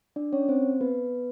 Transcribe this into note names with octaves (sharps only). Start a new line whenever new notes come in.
D4 D5
C#4 C#5
C4 C5
B3 B4